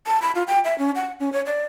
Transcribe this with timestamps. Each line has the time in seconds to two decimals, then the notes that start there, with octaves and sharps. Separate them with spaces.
0.07 A5
0.22 B5
0.35 F4
0.48 G5
0.65 E5
0.78 C#4
0.96 F#5
1.20 C#4
1.32 C#5
1.46 D5